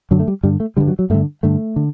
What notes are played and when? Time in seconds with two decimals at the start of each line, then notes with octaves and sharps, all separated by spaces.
0.11 F#2 D3 F#3
0.20 A3
0.28 G3
0.43 G2 D3 G3
0.60 A3
0.77 G2 D3 G3
0.88 F#3
0.99 F#3
1.10 G2 D3 A3
1.43 G2 D3 A3
1.76 D3